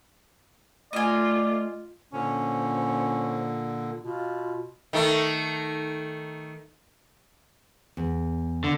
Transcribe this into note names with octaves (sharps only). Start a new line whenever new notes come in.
A3 F4 D5 D#5 G#5
A#2 D3 C#4 C5
B2 F4
D#3 A3
E2
D3